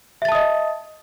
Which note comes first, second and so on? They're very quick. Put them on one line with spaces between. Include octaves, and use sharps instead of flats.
E5 A6 A5 D#6 D#5